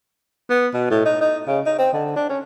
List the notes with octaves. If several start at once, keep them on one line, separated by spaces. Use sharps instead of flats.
B3
B2
A2
D#4
D#4
C#3
D#4
C4
D3
D4
C#4